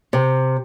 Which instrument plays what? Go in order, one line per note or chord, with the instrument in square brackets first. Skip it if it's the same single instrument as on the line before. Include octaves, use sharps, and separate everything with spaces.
[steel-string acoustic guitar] C3